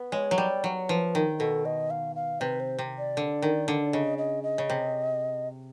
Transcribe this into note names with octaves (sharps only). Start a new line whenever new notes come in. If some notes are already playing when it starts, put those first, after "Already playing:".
Already playing: B3
G#3 C#5
F#3
G3 D5
F#3
F3 B4
D#3
B2 A4
D#5
F5
F5
C3 B4
C5
C3
D5
D3
D#3
D3
C#3 D#5
D#5
D#5
C#3
C3